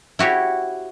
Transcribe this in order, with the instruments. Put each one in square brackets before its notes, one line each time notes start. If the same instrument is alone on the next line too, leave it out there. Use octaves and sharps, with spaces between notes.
[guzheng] E4 F#4 G4 C#5